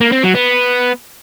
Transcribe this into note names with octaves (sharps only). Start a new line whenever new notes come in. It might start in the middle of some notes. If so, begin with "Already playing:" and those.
A#3
C4
F#3
B3